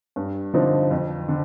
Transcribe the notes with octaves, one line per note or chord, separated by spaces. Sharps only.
G2
D3 F3 C4 D#4
F2
D3